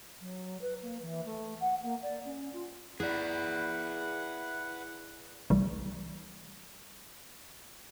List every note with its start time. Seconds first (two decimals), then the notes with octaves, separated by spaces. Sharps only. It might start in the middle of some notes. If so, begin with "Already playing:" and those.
0.21 F#3
0.61 B4
0.82 A#3
1.02 E3
1.26 A3
1.60 F#5
1.83 A#3
2.02 D5
2.25 C#4
2.53 F4
3.00 E4 G#4 B4 D5 F#5
5.50 C2 C3 E3 G3 A3